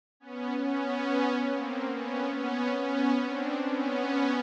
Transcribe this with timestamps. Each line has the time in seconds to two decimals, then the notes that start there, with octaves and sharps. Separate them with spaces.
0.20 B3 C#4
0.63 B3 C#4
1.51 A#3 C4
1.94 B3 C#4
2.38 B3 C#4
2.82 B3 C#4
3.25 C4 D4
3.68 B3 C#4